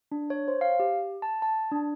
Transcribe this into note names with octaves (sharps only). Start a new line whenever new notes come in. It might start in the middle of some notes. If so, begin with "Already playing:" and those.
D4
C#5
C5
F5
G4
A5
A5
D4